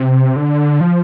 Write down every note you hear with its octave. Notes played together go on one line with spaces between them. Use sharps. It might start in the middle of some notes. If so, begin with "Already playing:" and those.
Already playing: C3
D3
F3